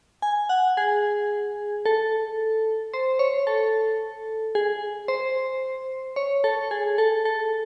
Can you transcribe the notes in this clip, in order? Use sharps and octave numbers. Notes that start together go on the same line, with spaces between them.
G#5
F#5
G#4
A4
C5
C#5
A4
G#4
C5
C#5
A4
G#4
A4
A4